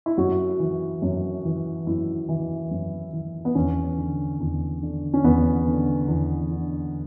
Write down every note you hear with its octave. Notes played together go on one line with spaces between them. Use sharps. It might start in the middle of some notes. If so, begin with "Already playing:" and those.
E4
F#2 F#4
E3
F#2
E3
F#2 E4
E3
F#2
E3
B3
E2 C#4
D3
E2
D3
C#4
E2 B3
D3
E2
D3